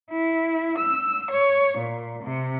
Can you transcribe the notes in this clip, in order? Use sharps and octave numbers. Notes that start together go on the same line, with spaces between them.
E4
E6
C#5
A#2
C3